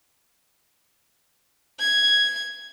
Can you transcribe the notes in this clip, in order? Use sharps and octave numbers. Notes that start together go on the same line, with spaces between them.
G#6